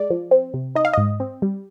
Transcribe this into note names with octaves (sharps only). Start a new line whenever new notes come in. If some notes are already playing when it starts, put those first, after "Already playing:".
Already playing: G#3 D5
F3
C4
C3
D#4 D#5
F5
G#2 D#5
C4
G3